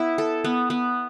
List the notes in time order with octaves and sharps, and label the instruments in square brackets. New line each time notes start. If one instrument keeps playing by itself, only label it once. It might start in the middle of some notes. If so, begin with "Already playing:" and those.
Already playing: [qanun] B3 E4
A4
B3
B3